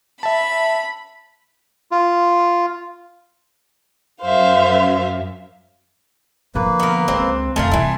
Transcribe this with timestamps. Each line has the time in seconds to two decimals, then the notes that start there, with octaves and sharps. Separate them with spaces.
0.23 E5 A5 B5
1.92 F4
4.22 F#2 C5 E5 F5
6.55 D3 F3 A#3 B4
6.80 B3 A#4
7.08 C#2 D3 C4
7.56 F2 D3 A3 A#4 F5 G#5 A5 C6
7.71 C3 E3 G3 E4